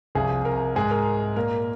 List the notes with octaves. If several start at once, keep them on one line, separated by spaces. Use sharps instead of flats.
C2 C3 F3 G#4
A#4
G#2 G#3 G#4
A#4
A#2 A#3 A#4